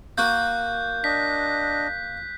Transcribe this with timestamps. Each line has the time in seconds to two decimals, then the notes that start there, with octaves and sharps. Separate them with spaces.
0.18 A#3 F#4 F#6 G6
1.04 D4 D#5 B6